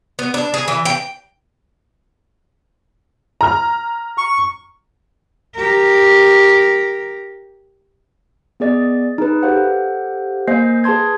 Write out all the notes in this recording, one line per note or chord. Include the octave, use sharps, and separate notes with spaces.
B3
D4
G#4
E3
G5
A#5 F6
C#6
G4 A#4
B3 G#4 D5 D#5 A6
D#4 G#4 B4
G4 A4 C5 F5 F#5
A#3 C5 D#5 G#5 G6 C7
G#4 B4 A5 C6 G#6